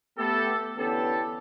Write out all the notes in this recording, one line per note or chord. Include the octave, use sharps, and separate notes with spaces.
A3 B3 G4 A4
D3 E3 B3 C#4 G4 A4